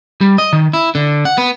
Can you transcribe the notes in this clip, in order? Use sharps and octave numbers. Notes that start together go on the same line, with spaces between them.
G3
D#5
D#3
E4
D3
F#5
B3